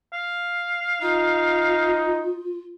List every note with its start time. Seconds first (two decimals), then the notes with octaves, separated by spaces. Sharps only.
0.13 F5
1.02 D#4 F4